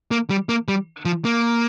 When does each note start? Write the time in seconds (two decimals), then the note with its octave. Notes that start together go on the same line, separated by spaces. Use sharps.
0.11 A#3
0.30 G3
0.49 A#3
0.68 G3
1.05 F3
1.25 A#3